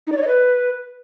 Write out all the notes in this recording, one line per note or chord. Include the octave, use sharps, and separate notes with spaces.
D#4
D5
C#5
D#5
B4